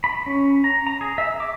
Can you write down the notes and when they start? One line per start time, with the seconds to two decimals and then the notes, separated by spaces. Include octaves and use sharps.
0.04 B5
0.26 C#4
0.64 A#5
0.87 A#5
1.01 G#4
1.18 E5
1.40 D6